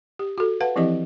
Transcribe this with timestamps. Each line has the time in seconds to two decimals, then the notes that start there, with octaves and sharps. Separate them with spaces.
0.19 G4
0.38 F#4 A4
0.61 B4 F5 F#5 A5
0.76 E3 F3 C4 E4 G4 D#5